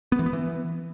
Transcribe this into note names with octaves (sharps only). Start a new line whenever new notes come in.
B3
E3
B3
E3